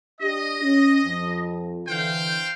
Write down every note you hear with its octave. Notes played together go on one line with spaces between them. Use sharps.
D4 G4 D#5
C#4
F2
D3 E3 C5 F5 G5